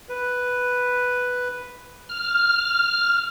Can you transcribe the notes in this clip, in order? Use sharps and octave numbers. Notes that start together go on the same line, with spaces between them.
B4
F6